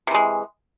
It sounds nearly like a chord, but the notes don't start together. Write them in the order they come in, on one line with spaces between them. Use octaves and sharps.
C3 E3 G#3